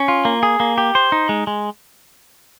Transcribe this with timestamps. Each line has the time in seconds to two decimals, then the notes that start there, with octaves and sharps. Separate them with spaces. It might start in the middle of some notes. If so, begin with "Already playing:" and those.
Already playing: C#4
0.08 F4
0.25 A#3
0.43 G#4
0.60 A#3
0.78 G4
0.95 C5
1.12 D#4
1.29 G#3
1.47 G#3